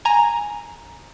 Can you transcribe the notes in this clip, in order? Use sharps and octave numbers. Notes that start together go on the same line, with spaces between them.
G#5 A#5